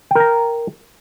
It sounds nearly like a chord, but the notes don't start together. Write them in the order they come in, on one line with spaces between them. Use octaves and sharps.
G5 A#4 A#5